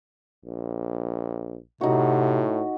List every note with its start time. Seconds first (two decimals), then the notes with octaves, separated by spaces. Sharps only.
0.46 A#1
1.81 A2 C3 D#4 F#4